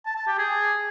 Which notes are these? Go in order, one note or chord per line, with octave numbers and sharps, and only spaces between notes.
A5
A5
G4
G#4